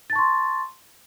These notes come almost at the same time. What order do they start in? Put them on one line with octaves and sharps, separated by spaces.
A6 A5 C#6 C6